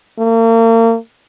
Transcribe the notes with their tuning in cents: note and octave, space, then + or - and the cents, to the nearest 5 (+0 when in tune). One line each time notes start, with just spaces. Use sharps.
A#3 -40